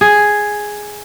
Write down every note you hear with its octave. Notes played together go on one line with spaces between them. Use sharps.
G#4